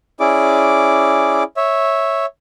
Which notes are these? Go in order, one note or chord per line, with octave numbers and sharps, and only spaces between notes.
C#4 E4 G#4 D5 D6
C#5 E5